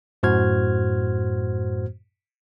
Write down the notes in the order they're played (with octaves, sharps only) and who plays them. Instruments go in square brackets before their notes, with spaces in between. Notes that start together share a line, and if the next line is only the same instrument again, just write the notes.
[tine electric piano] F#2 A2 F#4 C5 F6 G#6